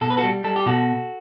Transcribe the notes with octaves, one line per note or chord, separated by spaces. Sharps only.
B2 A4
B4
F#4 A4
G3
G3 A4
G4
B2 F#4 A4